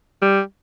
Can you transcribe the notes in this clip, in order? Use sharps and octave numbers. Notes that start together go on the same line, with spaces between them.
G3